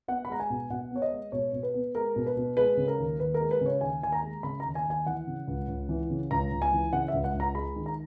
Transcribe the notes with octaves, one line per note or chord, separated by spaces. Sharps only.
B3 F#5
B5
G#3 A#5
G#5
B2
B2 F#5
B3 C#5
D#5
G#3
B2 C#5
B2
B4
B3
G#3 A#4
B2
B4
B2
G#3 B4
C#3
A#4
D#2
D#2 B4
A#4
G#3
B4
C#3 C#5
D#2 G#5
D#2 G#5
A#5
G#3
C#3 B5
D#2 A#5
G#5
D#2 G#5
E3 F#5
C#3
C#2
C#2
E3
C#3
C#2 A#5
C#2
G#5
E3
C#3 F#5
E5
C#2
F#5
C#2
A#5
G#3 B5
D#3
A#5